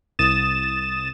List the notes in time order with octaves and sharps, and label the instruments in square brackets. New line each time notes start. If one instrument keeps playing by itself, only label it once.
[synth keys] C2 D#6 A6 E7